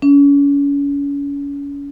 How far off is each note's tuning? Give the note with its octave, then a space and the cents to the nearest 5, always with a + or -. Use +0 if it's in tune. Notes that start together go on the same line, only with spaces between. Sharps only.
C#4 +35